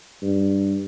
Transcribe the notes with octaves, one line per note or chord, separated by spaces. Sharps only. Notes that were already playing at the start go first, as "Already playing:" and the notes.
G2